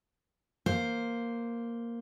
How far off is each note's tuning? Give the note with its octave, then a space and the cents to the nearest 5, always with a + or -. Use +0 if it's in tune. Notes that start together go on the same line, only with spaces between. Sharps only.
A#3 +0 C5 +0